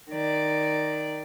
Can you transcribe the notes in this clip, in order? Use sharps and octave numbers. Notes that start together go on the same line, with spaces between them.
D#3 D5